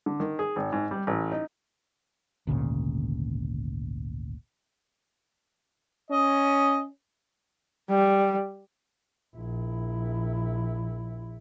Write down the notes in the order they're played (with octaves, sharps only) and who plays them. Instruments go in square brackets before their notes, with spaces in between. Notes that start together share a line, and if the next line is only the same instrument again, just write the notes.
[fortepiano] D3
D#3
G#4
G#1
G#2
G3
A1
D#4
[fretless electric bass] G#1 D2 A#2 C#3
[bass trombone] C#4 [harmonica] D#5
[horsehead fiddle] G3
[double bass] A#1 E4